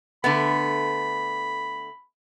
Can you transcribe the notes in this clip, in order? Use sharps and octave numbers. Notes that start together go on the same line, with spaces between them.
D3 A3 B3 B5